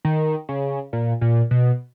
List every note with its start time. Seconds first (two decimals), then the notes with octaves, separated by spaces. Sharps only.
0.05 D#3
0.49 C#3
0.93 A#2
1.21 A#2
1.51 B2